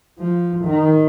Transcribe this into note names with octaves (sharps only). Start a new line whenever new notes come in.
F3
D#3